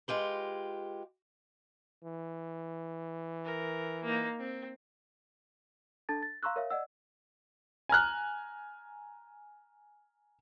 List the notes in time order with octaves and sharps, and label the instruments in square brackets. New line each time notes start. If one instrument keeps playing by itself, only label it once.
[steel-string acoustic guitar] G#3 F4 G4 B4
[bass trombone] E3
[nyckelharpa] A#4
A#3 D#4
C4
[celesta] D4 A4 A5 A6
A6
F5 A#5 C6 C#6 E6 F#6
A#4 C#5 E5 F5
D5 D#5 F#5 E6
[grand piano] G#5 A#5 F6 F#6